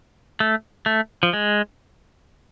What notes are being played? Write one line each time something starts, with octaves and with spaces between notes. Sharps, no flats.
A3
A3
F3
G#3